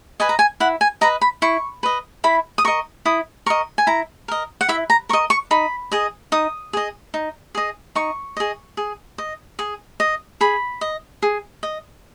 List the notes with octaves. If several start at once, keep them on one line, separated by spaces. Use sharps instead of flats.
B4 D#5 G#5
A#5
G#5
E4 F#5
G#5
B4 D#5 A#5
B5
E4 C#6
B4 D#5
E4 B5
D#6
A#4 D#5 C#6
E4 D#6
A#4 D#5 C#6
G#5
E4 A#5
A#4 D#5
F#5
E4 E5
A#5
A#4 D#5 C#6
C#6
D#4 B5
G#4 D#5
D#4 D#6
G#4 D#5
D#4
G#4 D#5
D#4 C#6
G#4 D#5
G#4
D#5
G#4
D#5
G#4 B5
D#5
G#4
D#5